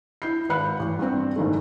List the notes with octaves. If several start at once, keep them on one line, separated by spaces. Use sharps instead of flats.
E4 G6 C7
G#1 B4 F#5 B5 F#6 C#7
A1
G2 C4
F#1 G#2 D#3 A3